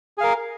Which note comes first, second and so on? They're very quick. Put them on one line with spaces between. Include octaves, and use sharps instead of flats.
G#4 F5 A#4